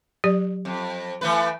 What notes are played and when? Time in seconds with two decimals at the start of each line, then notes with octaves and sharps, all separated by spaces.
0.24 F#3 G4 D5
0.65 F2
1.21 E3 A3 B4